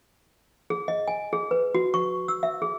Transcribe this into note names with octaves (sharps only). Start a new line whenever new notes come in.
G#4
D#5
G#5
G#4
B4
F#4
C#6
E6
E5
G#4